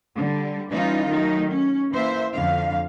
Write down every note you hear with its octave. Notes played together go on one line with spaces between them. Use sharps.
D3 G3
E3 G3 C#4 D#4 F4
D#3 F#3 A3 D#4
C#4
E3 A#3 C5 E5
F2 D3 F5